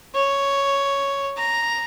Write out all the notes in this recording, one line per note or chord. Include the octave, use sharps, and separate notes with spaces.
C#5
A#5